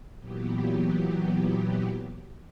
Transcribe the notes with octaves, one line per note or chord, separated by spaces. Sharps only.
A#2 E3 F#3 B3 G4